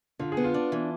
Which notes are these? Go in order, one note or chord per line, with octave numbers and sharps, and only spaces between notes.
D3 F4
G#4
B3
F4
D4
E3